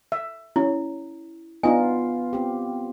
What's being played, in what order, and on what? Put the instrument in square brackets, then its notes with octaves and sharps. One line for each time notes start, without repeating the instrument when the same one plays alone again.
[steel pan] E5
[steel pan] C#4 [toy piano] E4
[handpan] B3 F4 [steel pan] D4 D#4 D#5 [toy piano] G#5
[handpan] C4 G4